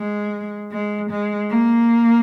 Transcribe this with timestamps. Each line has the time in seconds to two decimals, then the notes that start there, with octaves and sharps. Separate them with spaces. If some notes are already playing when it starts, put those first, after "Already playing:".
Already playing: G#3
0.71 G#3
1.10 G#3
1.50 A#3